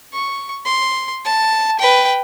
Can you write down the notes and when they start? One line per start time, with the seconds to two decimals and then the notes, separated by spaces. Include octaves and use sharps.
0.13 C#6
0.66 C6
1.25 A5
1.79 B4 G5